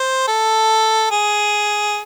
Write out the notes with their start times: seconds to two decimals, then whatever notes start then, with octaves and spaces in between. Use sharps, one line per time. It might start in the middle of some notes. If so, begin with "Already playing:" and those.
Already playing: C5
0.28 A4
1.11 G#4